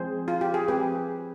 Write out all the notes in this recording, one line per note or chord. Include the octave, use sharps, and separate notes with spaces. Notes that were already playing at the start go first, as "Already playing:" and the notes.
Already playing: F3 G#3 C4 G#4 C5
F4
G4
G#4
F3 G#3 C4 G4 B4